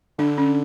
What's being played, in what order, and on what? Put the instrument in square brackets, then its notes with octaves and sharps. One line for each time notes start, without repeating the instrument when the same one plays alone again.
[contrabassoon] D3 [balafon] D4
[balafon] C#4